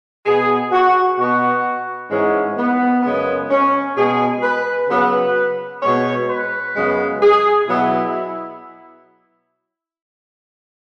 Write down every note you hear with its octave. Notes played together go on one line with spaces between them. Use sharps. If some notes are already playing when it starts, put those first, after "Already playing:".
B2 B3 G#4
F#4
B2 B3 F#4
G#2 E3 G#3 C#4
B3
F#2 C#3 G#3 B3
C#4
B2 G#3 B3 G#4
B4
C#3 F#3 B3 B4
B2 G#3 B3 C#5
B4
F#2 C#3 G#3 B3
G#4
B2 F#3 B3 E4